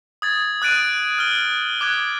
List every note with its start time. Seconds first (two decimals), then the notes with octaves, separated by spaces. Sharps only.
0.22 D#6 G#6 A6
0.62 D#6 F#6 A6 D7 D#7
1.18 F6 G7
1.81 D6 F#6 G#6